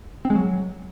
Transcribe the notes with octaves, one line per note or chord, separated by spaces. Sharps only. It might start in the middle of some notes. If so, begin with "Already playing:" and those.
C4
G#3
F#3